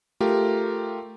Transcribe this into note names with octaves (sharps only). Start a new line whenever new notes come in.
A3 F4 G4 A#4